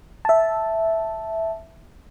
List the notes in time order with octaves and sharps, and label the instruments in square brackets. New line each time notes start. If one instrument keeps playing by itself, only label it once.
[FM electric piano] E5 A5